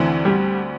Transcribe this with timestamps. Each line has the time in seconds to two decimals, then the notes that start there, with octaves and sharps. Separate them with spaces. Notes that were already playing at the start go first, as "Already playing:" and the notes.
Already playing: D2 D3 E3 C4
0.25 G3